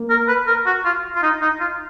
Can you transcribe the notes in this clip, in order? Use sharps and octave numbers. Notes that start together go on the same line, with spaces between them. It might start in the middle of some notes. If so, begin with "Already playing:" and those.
Already playing: A#3
A#4
B4
A#4
F#4
F4
F4
D#4
D#4
F4